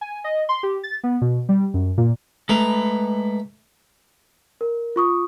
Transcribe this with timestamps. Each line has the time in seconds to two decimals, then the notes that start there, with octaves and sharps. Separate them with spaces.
0.01 G#5
0.24 D#5
0.49 C6
0.63 G4
0.83 A6
1.03 B3
1.21 B2
1.49 G3
1.74 F#2
1.98 A#2
2.49 G#3 A3 B4 A#5
4.61 A#4
4.96 F4 C#6 D#6